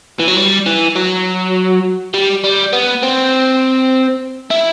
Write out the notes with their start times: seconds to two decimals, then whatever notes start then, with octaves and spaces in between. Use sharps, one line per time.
0.20 E3
0.28 F#3
0.37 G3
0.66 E3
0.95 F#3
2.14 G3
2.44 G3
2.73 B3
3.03 C4
4.51 E4